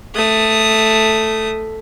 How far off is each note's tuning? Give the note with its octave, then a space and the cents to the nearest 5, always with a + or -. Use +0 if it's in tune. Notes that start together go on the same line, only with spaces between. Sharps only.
A3 +0 D#6 -5